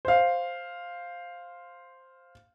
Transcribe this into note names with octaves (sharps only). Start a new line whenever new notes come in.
C5 F5